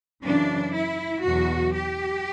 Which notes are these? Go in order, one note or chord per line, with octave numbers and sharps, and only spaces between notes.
F#2 C#3 E3 D4
E4
E2 B2 F#3 F#4
G4